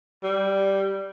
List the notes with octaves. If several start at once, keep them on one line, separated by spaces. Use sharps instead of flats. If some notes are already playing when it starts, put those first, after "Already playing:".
G3